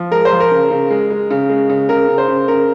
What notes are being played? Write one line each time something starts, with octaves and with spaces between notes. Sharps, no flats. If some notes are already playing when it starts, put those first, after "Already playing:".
Already playing: F3
G#3 A#4
C5
F3
A#4
C#3
C#3
G#3
G#3
C#3
G#3
C#3
C#3 A#4
C#3
C5
C#3
C#3 A#4